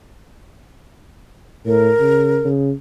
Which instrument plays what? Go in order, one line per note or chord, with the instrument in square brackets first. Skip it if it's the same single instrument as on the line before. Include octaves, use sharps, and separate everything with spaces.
[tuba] A2 [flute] A#4
[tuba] C#3
C#3